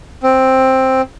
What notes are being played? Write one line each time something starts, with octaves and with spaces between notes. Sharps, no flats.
C4